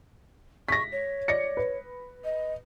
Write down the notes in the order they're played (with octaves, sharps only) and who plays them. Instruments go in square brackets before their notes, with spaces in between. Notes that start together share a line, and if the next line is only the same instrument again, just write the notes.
[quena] C#6 [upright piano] A#6 B6
[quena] C#5
[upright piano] D5 A#6 C#7
B4
[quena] D#5